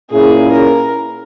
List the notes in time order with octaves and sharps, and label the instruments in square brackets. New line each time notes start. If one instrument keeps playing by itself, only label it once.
[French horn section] A#2 A#3 C#4 E4 [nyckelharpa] G#4
[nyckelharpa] A#4